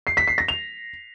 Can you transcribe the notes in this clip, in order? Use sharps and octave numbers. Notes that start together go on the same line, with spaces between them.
C7
B6
C7
A#6
F7